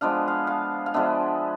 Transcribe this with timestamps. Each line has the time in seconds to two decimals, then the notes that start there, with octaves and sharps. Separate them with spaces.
0.01 F3 G#3 B3 D4 F5
0.28 F5
0.47 F5
0.86 F5
0.94 F3 G#3 B3 D4 E5